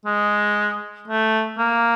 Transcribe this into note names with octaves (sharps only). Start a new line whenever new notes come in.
G#3
A3
A#3